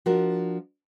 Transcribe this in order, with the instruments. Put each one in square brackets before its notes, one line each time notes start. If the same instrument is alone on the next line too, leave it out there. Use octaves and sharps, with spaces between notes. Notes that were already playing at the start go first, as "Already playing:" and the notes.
[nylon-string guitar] F3 D4 F#4 A#4